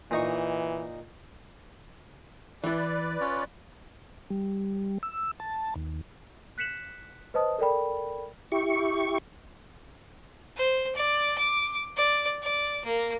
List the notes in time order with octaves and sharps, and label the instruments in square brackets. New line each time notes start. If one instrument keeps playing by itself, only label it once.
[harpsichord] A#2 D#4 C#6 [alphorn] E3
[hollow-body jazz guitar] E3 E4 [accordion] B4 D5
[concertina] C#4 F4 C#5
[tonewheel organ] G3
E6
A5
D#2
[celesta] F#6 B6 C#7 E7 F#7
B4 C5 D#5 A5 D#6
A4 A#4 D5 G5 B5
[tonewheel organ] E4 G4 C#6
[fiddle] C5
D5
D6
D5
D5
A#3